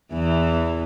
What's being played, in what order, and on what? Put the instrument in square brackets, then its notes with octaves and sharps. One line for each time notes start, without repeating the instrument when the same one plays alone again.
[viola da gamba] E2 E3